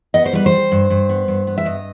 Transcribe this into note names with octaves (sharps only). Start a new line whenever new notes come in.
B3 D#5
C5
G3 B4
C5
G3
G2
G2
B3
G2
B3
E5
G2 D#5